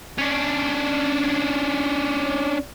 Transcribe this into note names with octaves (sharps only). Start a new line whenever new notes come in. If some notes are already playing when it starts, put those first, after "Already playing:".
C#4 D4